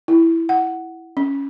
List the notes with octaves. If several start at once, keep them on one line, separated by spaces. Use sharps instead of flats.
E4
F#5
C#4